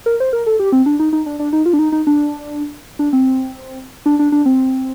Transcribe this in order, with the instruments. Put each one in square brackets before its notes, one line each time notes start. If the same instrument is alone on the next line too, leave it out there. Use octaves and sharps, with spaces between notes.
[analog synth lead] A#4
C5
A#4
A4
G4
C4
D4
D#4
D#4
D4
D4
D#4
F4
D4
D#4
D#4
D4
D4
C4
D4
D4
D4
C4